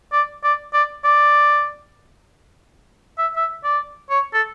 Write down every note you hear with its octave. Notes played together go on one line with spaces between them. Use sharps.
D5
D5
D5
D5
E5
E5
D5
C#5
A4